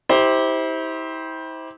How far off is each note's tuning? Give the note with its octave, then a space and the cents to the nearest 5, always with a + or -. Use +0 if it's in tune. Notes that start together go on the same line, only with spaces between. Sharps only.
E4 -35 G4 +0 C5 +0